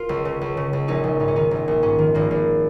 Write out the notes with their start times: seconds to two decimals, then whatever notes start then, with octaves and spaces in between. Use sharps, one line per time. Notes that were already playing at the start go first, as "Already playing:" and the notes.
Already playing: F4 A#4
0.09 C#2
0.25 C#3
0.41 C#2
0.57 C#3
0.73 C#2
0.88 A#1 D#4
1.04 A#1
1.20 G#2 D#4
1.28 C#4
1.36 D#3 D#4
1.51 A#1
1.68 A#1
1.83 G#2 C#4
1.99 D#3
2.14 G#1 A#3
2.31 G#1